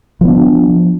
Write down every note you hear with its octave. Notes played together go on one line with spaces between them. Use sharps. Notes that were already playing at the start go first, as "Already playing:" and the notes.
F3 B3 D4